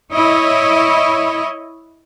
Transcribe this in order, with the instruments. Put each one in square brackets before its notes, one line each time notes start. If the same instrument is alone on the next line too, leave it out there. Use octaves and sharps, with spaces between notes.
[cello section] E4 C#5 D#5